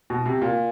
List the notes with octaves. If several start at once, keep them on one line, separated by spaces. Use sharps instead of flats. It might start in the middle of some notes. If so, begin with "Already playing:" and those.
B2
C3
A#2